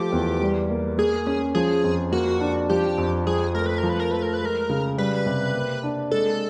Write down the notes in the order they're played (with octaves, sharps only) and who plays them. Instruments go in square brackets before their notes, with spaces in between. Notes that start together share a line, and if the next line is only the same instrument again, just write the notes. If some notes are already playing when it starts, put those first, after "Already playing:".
Already playing: [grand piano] F3 A3 [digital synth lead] G4
[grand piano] E2
G3
A#3
[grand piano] A#3 [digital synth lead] G#4
[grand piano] C#4
[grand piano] F3 [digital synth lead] G#4
[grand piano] F2
[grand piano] A#3 [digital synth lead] F#4
[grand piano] D4
[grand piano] F3 [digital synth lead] G4
[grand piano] F2
[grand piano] F3 [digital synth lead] G#4
[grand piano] A3 [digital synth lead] A#4
[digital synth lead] B4
A#4
[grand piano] F3
[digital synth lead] B4
A#4
[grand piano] A3 [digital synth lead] B4
[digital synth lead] A#4
B4
[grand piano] G#3 [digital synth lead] A#4
[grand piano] C#3
[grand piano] G3 [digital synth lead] B4
[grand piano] C3
A#3
D4
[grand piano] G#3 [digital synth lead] A4